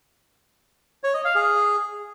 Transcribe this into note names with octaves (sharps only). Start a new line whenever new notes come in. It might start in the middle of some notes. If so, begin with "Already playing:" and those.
C#5
D#5
F5
G#4